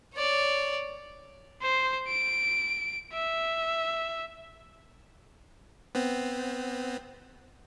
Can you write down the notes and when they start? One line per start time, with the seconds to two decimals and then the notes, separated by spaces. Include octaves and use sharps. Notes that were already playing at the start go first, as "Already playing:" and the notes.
0.14 C#5 D5
1.62 C5
2.08 D7
3.13 E5
5.95 B3 C4